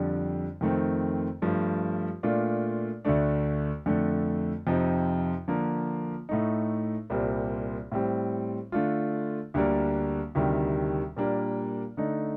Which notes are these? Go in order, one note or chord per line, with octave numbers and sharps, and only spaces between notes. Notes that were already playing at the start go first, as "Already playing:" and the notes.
Already playing: F2 D3 G3 D4
F2 D#3 A3 C4
G2 F3 A3
A#2 A3 D4 F4
D2 D3 A3 D4
F2 D3 A3
F2 C3 F3 C4 D#4
D3 F3 A#3
A2 A3 D#4
C2 A#2 G3 C4
A2 G3 C4
D3 A3 D4 F4
D2 D3 G3 A#3 D4
D2 C3 D#3 G3
A#2 G3 A#3 D4
D3 A3 D#4